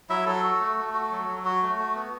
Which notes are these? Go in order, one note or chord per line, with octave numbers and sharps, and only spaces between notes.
F#3 E4 E5
F#3 A4
F#4
A3
A3
F#4
F#3
F#3
F#4
A3
A3
B3